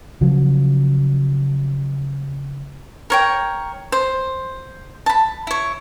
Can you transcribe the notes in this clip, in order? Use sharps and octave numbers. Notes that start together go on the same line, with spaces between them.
C#3 F3 F#3
A#4 C#5 G5
C5
A5 B5
E4 C#5